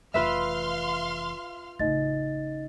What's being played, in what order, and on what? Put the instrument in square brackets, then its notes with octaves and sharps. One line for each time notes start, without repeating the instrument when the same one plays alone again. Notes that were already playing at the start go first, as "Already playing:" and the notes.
[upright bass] F1 E3 [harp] F4 B4 E5 [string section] F5 C6 F6
[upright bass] A1 C#3 [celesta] D#4 D#5 A6